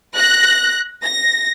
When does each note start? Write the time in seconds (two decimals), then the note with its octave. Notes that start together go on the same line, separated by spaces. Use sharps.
0.15 F#6 A#6
1.04 A#6